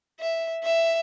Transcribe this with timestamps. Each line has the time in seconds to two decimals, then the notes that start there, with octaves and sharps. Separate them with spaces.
0.20 E5
0.63 E5